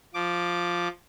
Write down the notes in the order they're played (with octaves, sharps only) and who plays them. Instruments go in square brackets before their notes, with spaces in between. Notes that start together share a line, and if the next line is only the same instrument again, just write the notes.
[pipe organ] F3 D6